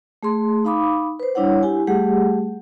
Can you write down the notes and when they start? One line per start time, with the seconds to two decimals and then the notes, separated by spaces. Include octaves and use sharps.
0.23 A3 G#4 C6
0.65 D#4 F5 B5 D6 D#6
1.20 B4 C5
1.35 G3 D4 E4 C#5 F#5
1.63 E4 G4 G#5
1.87 G3 A3 G4 G#4 F#5